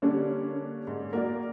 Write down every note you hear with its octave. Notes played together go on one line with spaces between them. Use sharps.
D3 G3 A#3 C#4 D4
G#2
A#3 F#4 A#4 D5